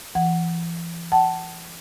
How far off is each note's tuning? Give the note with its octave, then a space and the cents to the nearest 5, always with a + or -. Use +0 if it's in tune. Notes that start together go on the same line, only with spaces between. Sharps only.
E3 +40 F#5 +0
F#5 +35 A5 +0